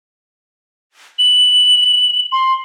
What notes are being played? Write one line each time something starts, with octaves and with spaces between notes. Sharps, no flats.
F#7
C6